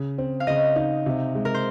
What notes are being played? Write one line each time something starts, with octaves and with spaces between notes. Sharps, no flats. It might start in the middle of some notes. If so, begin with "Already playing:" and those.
Already playing: C#3
C4
F5
C#3 D#5
D#4
C3
G#3
A#4
C5